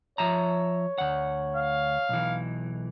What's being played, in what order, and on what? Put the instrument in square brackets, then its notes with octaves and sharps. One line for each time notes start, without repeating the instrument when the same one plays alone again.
[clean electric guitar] F3 E5 A#5 [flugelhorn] C#5
[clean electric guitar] D2 F#5
[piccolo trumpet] F5
[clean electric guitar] B1 E3